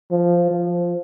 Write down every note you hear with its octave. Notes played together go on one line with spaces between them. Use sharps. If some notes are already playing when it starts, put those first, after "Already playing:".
F3
F3